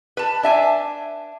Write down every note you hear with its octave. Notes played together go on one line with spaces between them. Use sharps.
B4 A5
D4 E5 G#5